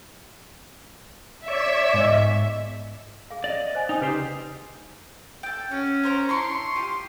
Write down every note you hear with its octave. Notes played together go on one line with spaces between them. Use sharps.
C#5 D5 E5
G#2 G#3 B3
G#4 F5
D5 D#5
C5 G#5
D#4 G5 G#5 D#6
C#3 G4 B4 C5
A4 G5
C#4 F#4
A#4 C5 A#5
D4 E4 C6 C#6
F4 G4